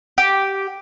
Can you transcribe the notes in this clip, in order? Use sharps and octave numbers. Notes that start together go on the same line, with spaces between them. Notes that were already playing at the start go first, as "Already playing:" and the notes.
G4